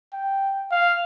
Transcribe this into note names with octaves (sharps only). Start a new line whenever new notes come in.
G5
F5